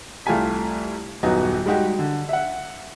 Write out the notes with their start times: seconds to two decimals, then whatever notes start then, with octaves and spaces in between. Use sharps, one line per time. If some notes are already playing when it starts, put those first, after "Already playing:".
0.26 C2 A3 F4 G4 G#5 B6
1.23 D#1 F#2 B3 D#4 F#4 D#5
1.66 G3 G#3 D#4 F#4 G4
1.99 D3
2.29 E5 F#5